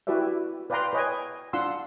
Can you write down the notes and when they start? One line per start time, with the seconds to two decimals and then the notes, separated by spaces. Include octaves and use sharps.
0.07 E4 F#4 G4 B4 D5 E5
0.70 B4 D5 F5 G5 A#5 C6
0.93 B4 C#5 D#5 G5 G#5
1.53 D4 F4 F#5 C6 E6